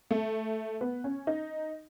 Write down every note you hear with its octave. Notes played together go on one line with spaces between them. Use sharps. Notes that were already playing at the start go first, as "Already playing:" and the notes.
A3
B3
C#4
D#4